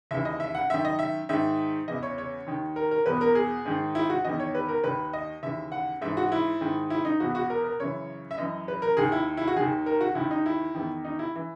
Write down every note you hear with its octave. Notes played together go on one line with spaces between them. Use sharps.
D#2 C#3 E3 E5
D#5
E5
F#5
F#2 D#3 E5
D#5
E5
G#2 D#3 E5
E2 C#3 E3 D#5
C#5
C#5
D#2 D#3
A#4
A#4
E2 B2 B4
A#4
G#4
G#2 D#3
E4
F#4
E2 D#3 D#5
C#5
B4
A#4
D#2 D#3 B4
D#5
D#2 C#3 E3 E5
F#5
G#2 E3 E5
F#4
E4
G#2 D#3
E4
D#4
E2 B2 F#4
F#4
A#4
A#4
F#2 C#3 E3 C#5
E5
F#2 E3 D#5
B4
A#4
D#2 D#3 G#4
E4
E4
F#4
D#2 D#3 G#4
A#4
F#4
D#2 D#3 E4
D#4
E4
E2 D#3
D#4
E4
E3